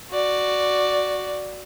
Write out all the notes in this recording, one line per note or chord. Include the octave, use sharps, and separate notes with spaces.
F#4 D5